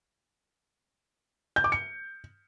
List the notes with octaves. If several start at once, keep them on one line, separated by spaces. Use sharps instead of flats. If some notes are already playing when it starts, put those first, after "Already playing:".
G6
D6
C#7